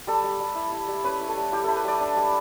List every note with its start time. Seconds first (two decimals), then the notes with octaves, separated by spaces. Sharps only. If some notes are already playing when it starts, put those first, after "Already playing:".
0.07 G3 A4
0.24 G3
0.40 G3
0.55 E4
0.72 E4
0.88 G3
1.04 C#4 B4
1.21 E4
1.28 A4
1.37 G3
1.52 E4 G4
1.64 E4 A4
1.76 B4
1.84 G3 D5
2.00 D4
2.17 G3